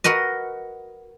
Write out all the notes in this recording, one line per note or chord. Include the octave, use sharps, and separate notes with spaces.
F#4 A#4 B4 D#5